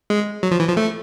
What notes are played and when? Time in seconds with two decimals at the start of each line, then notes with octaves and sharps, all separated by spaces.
0.10 G#3
0.43 F#3
0.51 F3
0.60 E3
0.68 F3
0.77 A3